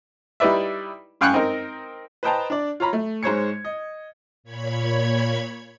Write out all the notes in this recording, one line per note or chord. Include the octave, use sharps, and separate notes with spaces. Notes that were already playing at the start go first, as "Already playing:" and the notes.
G3 D#4 E4 B4 D5 E5
F#2 F5 G5 G#5 C#6 F#6
C4 D#4 A#4
B4 C5 D#5 G5 A5 A#5
D4 D5
F4 C#5 A#5 B5
A3
G#2 G#3 C5 C#5 G#6 C#7
D#5
A#2 C#5 B5 G#6